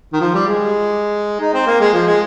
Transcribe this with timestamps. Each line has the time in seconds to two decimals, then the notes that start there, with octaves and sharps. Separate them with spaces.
0.13 D#3
0.21 F3
0.34 G3
0.47 G#3
1.40 D#4
1.54 C4
1.67 A#3
1.80 G#3
1.93 F3
2.07 G#3